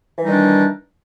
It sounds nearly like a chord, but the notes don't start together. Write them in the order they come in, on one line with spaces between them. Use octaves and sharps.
E3 D#4 G3 D#3 D4